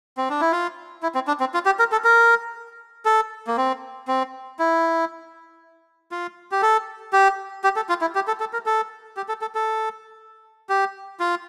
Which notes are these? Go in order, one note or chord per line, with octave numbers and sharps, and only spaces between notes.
C4
D4
E4
F4
E4
C4
D4
C4
F4
G4
A#4
A4
A#4
A4
A#3
C4
C4
E4
F4
G4
A4
G4
G4
A4
F4
E4
G4
A4
A4
A#4
A4
G4
A4
A4
A4
G4
F4